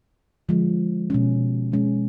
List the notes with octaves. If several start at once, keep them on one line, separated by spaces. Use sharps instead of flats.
D3 F3 G#3
B2 G#3 C#4
B2 G#3 C#4